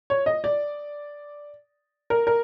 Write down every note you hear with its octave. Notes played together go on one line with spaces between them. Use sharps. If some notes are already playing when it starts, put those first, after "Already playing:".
C#5
D#5
D5
A#4
A#4